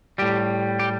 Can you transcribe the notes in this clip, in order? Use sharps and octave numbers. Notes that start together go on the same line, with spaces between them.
A2 G3 G4
G4